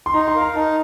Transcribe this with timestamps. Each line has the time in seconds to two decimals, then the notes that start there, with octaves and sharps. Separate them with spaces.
0.06 C6
0.14 D#4 A#5
0.28 C6
0.35 A#4 F5
0.41 A#5
0.56 D#4 A5